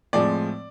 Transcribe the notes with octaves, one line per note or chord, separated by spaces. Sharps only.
A2 F3 G#3 C4 D5